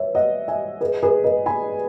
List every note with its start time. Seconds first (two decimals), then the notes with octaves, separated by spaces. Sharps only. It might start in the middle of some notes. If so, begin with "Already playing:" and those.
Already playing: B4 C#5 E5
0.15 D#5 F#5
0.48 E5 G#5
0.81 G#4 B4
1.03 G#4 B4
1.24 B4 D#5
1.46 G#5 B5